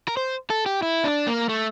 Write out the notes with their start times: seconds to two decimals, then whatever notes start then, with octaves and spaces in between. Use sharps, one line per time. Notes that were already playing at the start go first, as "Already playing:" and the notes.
0.08 A#4
0.17 C5
0.50 A4
0.66 G4
0.82 E4
1.04 D4
1.27 A#3
1.49 A3